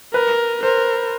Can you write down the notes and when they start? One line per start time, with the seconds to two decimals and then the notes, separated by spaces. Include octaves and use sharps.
0.14 A#4 B4
0.63 A#4 C5